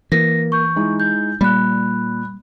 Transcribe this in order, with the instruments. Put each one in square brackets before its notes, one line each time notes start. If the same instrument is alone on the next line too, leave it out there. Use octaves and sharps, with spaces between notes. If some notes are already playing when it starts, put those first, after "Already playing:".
[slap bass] E3 [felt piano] A#3 [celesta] A#6
[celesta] C#6 G6
[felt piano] G#3 D#4 E4
[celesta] G6
[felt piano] A#2 [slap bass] G3 [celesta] B5 F#6